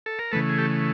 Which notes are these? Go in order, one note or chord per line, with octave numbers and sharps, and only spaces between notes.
A4
A#4
C#3 E3 A3 A4 B4
G#4
G4 A4